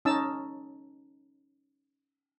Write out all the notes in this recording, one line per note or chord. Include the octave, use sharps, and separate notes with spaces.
C#4 D#4 A5 E6